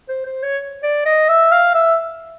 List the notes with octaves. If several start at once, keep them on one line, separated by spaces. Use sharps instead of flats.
C5
C5
C#5
D5
D#5
E5
F5
E5